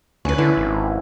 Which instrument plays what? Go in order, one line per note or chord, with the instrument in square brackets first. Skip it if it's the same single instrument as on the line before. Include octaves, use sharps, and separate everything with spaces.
[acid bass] D2 [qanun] C#4 B4
[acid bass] D3 [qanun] E4
[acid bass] G#1